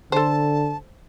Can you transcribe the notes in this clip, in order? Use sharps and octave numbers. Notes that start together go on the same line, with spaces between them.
D3 A4 C5 A5